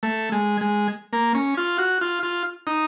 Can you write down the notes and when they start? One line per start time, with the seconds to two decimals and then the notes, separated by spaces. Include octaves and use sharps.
0.03 A3
0.32 G#3
0.61 G#3
1.13 A#3
1.34 C#4
1.57 F4
1.78 F#4
2.01 F4
2.23 F4
2.67 D#4